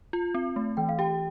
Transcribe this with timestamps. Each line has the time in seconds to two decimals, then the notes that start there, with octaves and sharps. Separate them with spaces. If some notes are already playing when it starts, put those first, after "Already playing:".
0.13 F4
0.34 C4
0.56 A3
0.77 E3 G5
0.89 F5
0.99 G4 G5